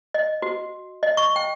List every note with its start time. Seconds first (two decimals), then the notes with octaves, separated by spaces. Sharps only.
0.14 D#5
0.42 F#4
1.03 D#5
1.17 C#6
1.36 G5